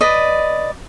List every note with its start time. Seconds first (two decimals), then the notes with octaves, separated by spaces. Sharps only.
0.01 B4 D5 D#5